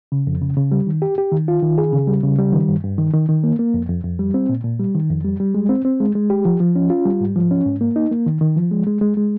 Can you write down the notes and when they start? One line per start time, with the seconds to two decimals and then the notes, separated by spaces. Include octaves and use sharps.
0.12 C#3
0.27 F2
0.42 C#3
0.57 C#3
0.72 G3
0.87 D#3
1.02 G4
1.18 G4
1.32 D#3
1.48 F4
1.62 D#3
1.78 G#4
1.93 C#3
2.07 G3
2.23 C#3
2.39 G3
2.53 D#3
2.69 G2
2.83 G2
2.98 D#3
3.14 D#3
3.29 D#3
3.44 A#3
3.59 A#3
3.74 F2
3.89 F2
4.04 F2
4.19 G3
4.34 C4
4.49 A#2
4.64 A#2
4.79 G3
4.94 D#3
5.10 F2
5.25 G3
5.40 G3
5.55 G#3
5.69 C4
5.85 C4
6.00 G#3
6.15 G#3
6.30 G4
6.45 F3
6.60 F3
6.76 C#4
6.90 F4
7.05 G3
7.21 G#2
7.36 F3
7.51 C#4
7.66 G#2
7.81 A#3
7.96 D#4
8.11 A#3
8.26 D#3
8.41 D#3
8.57 F3
8.71 G#3
8.87 G#3
9.01 G#3
9.17 G#3